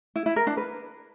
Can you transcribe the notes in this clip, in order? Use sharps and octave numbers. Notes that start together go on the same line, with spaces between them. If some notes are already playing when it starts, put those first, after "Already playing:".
E4
E4
A#4
D4
B4